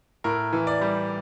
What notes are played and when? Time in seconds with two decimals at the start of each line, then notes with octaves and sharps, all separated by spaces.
0.24 A2 A#4
0.53 E3
0.67 D5
0.81 G3